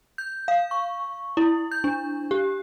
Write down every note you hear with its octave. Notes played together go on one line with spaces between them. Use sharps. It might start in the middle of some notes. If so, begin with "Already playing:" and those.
G6
F5
C#6
E4
G6
D4
G4